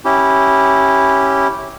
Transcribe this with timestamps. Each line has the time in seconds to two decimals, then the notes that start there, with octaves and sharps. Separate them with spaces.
0.05 C#4 E4 G4